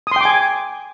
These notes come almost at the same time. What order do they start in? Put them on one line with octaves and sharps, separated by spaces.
D#6 C6 G5 D6 G#5